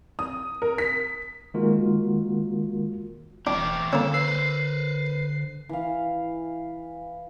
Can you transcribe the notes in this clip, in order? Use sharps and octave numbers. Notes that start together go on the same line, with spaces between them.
D#6
A#4
B6
D#3 G#3 A#3 F4 F#4 A#4
E1 E3 A3 D4 G5 D6
D3 A#3 C#4 A4 E6
B4 C5 C7
E3 F5